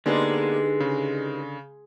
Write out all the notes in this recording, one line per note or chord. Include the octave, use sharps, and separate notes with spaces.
D3 G#3 A#3 B3 D4 D#4 G4 B4
C#3